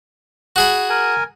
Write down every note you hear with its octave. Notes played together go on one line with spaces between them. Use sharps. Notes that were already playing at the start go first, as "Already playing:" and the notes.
F#4 G#4 B5
A#4 G#5